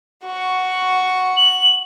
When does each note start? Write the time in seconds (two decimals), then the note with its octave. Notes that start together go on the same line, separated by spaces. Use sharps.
0.25 F#4 C#6
1.37 F#7